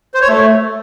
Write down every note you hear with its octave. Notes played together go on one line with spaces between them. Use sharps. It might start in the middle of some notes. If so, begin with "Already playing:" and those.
C5
C#5
A3